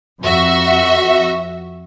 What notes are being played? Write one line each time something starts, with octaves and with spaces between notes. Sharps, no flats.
F2 F#4 E5